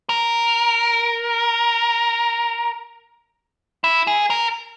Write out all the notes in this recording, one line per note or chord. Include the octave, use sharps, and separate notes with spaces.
A#4
E4
G#4
A#4